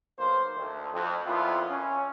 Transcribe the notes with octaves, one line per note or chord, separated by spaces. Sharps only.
B1 A#3 C5
D2
F2
F2 A#2 B3 E4 F4
C#4